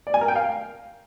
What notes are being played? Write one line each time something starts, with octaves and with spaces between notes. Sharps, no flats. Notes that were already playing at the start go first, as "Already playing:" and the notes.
D5
G#5
A#4
G5
F5